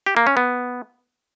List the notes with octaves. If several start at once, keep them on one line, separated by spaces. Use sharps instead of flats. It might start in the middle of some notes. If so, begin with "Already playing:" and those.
G4
A#3
C#4
B3